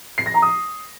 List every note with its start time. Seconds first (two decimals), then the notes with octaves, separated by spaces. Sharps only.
0.18 C7
0.26 A#6
0.34 A#5
0.42 D#6